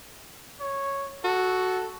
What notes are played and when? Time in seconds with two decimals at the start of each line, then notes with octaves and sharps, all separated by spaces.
0.60 C#5
1.25 F#4 A4